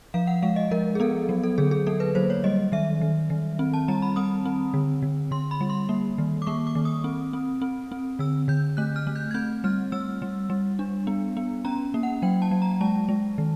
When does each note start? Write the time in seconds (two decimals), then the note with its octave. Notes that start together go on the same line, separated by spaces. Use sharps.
0.14 F3 F5
0.27 F#5
0.42 G#3 F5
0.56 D#5
0.71 F3 A#4
0.95 G#4
1.00 B3 A4
1.29 F#3
1.43 A4
1.58 D3 G#4
1.71 G#4
1.87 A#3 A4
2.00 B4
2.15 F#3 C5
2.30 C#5
2.44 G3 D#5
2.72 D#3 E5
3.01 D#3
3.30 D#3
3.59 C4
3.74 A5
3.88 G3 A#5
4.02 B5
4.16 C4 D#6
4.45 C4
4.74 D3
5.02 D3
5.31 D3 C6
5.51 B5
5.61 G3
5.70 C6
5.89 A#3
6.18 D#3
6.42 D6
6.47 A#3 C#6
6.67 D6
6.75 D#3
6.85 D#6
7.04 C4
7.33 C4
7.62 C4
7.92 C4
8.19 D3 E6
8.48 D3 G6
8.77 A3 F#6
8.96 F6
9.07 A3
9.16 G6
9.31 G#6
9.34 C4 G6
9.64 G3 F6
9.92 G3 E6
10.22 G3
10.50 G3
10.79 D4
11.07 B3
11.37 B3
11.65 C#4 A#5
11.94 A#3
12.03 F#5
12.22 F#3 G5
12.42 A5
12.51 F#3
12.62 A#5
12.81 G#3 A5
13.09 G#3
13.38 D#3